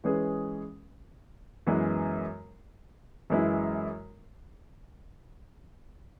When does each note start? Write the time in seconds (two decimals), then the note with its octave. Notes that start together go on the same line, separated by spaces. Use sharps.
0.04 E3 G#3 C#4 G#4 B4
1.67 F#2 E3 G#3 B3
3.30 F#2 E3 G#3 E4